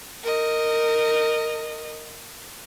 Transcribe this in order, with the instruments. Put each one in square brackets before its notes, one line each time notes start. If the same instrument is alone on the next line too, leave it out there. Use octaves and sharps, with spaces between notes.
[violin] A#4 D#5